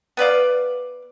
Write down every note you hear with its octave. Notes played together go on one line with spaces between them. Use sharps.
B3 B4 D5 F5